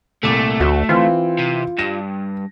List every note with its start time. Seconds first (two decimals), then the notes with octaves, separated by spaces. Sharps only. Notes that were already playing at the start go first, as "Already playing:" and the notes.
0.23 C2 A#2 A3 D6
0.60 D2 F#4
0.89 E3 C4 F4
1.39 C3
1.79 G2 A#6